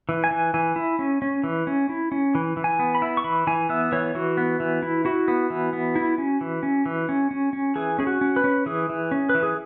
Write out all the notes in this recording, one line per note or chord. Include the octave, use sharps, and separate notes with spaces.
E3
G#5
E3
E3 G#5
E4
C#4
C#4
E3
C#4
E4
C#4
E3
E3
G#5
B3
B5
E4
C#6
E3 B5
E3 G#5
B3 E5
E3 C#5
E3 F#4
B3
E3
E4
E4 F#4
B3
E3
B3
E4
C#4
E3
C#4
E3
C#4
C#4
C#4
E3 G#4
C#4 G#4
F#4
C#4
B4
C#4
E3 G#4
E3
C#4
B4
E3
G#4